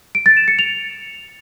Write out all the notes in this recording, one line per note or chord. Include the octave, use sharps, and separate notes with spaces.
D7
A6
E7
C#7
F7